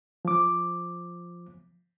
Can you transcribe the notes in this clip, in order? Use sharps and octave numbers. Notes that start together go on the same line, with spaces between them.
F3 D6